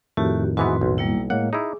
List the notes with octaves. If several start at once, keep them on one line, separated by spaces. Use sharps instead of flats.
F2 A2 D#3 A3 F#4 G4
G#2 E3 B3 F#4 B4 C6
B1
G3 A#3 E4
A2 G#3 A#3 C#5 F#5
D#4 E4 G#4 D6